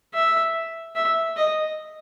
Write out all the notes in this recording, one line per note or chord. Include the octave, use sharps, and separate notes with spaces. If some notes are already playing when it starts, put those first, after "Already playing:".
E5
E5
D#5